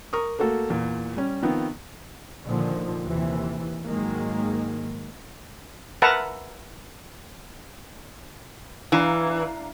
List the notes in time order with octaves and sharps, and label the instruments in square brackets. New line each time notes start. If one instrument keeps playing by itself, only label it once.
[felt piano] A#4 C#6 D#6
A3 A#3 F#4 A4
E2 A#2
G3 C#4
D#3 F3 B3 C4
[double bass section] A#2 D3 D#3 F3
D#2 C3 E3
G#2 D#3 F#3 G#3 A#3
[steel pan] A#4 B4 E5 F#5 A5 A#5
[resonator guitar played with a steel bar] E3 [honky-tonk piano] D4 F5 A#5